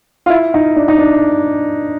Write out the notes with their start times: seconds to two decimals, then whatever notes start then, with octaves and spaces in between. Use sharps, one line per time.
0.26 F4
0.30 E4
0.54 D#4
0.76 D4
0.88 D#4
0.98 D4